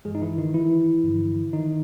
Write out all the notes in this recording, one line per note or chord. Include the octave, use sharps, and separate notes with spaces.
G2 E3 G#3 G#4
D#4
E3 E4
D#3 D#4
E3 E4
G2 D3 F3
D#3 D#4